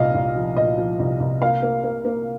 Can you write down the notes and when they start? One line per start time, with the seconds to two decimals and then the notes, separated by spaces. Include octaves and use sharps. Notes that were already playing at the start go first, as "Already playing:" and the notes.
Already playing: C2 A#2 D#5 F5
0.14 C2
0.36 F3
0.56 A#2 D#5
0.78 F3
0.99 C2
1.20 C2
1.42 A#3 F5
1.62 A#3
1.84 A#3
2.05 A#3